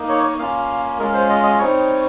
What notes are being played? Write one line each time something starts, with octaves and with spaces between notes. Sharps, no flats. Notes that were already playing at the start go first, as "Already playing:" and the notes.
Already playing: A#3 D#4
C#5
C#5
A#3 C#4 F4 F5
G#3 C#4 F4 A#4
C5
D#5
D#5
G3 C4 D#4 C#5